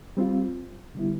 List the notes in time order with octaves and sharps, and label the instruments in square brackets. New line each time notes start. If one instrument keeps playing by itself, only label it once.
[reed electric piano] G3 C4 F4
D3 G3 B3 E4